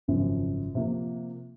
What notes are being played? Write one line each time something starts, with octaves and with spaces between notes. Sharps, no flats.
G#1 F#2 C#3 F3
C3 F3 A#3